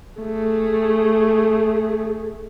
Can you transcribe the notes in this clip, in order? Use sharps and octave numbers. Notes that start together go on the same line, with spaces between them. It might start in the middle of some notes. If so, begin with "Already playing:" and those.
A3 G#4